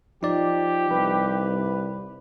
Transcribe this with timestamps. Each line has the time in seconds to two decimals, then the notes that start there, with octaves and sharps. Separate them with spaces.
0.23 F3 D#4 G4 D5
0.91 C2 B4